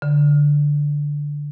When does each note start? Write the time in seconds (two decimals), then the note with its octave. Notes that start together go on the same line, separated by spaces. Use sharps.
0.02 D3